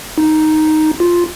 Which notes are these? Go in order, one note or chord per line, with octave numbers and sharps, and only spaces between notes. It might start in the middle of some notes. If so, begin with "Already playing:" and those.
D#4
F4